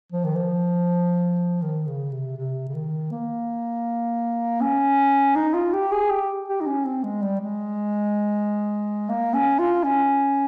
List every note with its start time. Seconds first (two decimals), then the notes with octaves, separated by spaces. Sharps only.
0.13 F3
0.24 D#3
0.35 F3
1.62 D#3
1.87 C#3
2.12 C3
2.37 C3
2.69 C#3
2.75 D#3
3.12 A#3
4.61 C#4
5.36 D#4
5.54 F4
5.74 G4
5.92 G#4
6.10 G4
6.48 G4
6.61 D#4
6.66 C#4
6.85 C4
7.04 G#3
7.22 G3
7.41 G#3
9.09 A#3
9.34 C#4
9.59 F4
9.84 C#4